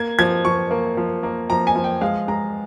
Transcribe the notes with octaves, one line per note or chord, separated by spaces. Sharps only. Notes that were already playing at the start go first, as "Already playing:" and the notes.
Already playing: A#3 G#6
F3 G#6
F3 C#6
A#3
F3
A#3
F3 A#5
G#5
F3
G5
G#3 F5
G#3 A#5